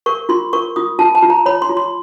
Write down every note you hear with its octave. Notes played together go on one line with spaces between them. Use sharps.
A#4 C#6
F4 C6
A#4 C#6
F4 D#6
F4 A5
A5
F4
A#5
C#5 B5
C6
F4
C6